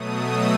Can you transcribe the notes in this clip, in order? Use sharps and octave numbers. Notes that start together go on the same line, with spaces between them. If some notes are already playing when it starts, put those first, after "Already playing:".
Already playing: B2 F#3 A3 D#6
E6